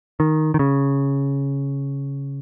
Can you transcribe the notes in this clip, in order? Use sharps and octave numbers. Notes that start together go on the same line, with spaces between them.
D#3
D#3
C#3